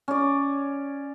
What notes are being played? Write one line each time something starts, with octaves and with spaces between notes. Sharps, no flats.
C#4 D5